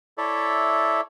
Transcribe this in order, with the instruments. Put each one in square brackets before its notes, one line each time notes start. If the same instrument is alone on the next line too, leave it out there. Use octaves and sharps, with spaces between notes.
[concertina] E4 A4 C#5 D5 E5